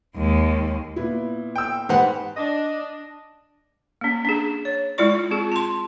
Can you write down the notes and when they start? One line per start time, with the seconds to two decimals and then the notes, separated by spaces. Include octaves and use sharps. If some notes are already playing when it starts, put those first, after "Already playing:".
0.16 D#2 G#3
0.96 A#2 B3 E4
1.55 G5 E6
1.89 G#2 G4 B4 C5 F#5
2.36 D4 D#5
4.01 A#3 C#4
4.25 C#4 D4 G#4
4.65 C#5
4.98 G#3 E4 F4 D5 C#6
5.31 C4 F4 G#4
5.52 A5 C6